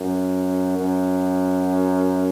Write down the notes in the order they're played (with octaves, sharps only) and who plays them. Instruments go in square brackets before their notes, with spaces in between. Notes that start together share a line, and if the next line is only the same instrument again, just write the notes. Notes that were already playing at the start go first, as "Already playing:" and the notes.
Already playing: [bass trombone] F#2
F#2